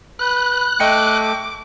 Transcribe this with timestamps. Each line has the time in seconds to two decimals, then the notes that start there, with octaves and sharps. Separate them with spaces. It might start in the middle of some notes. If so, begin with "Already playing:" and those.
0.19 B4 F#6
0.80 A3 D#5 G5 D6 C#7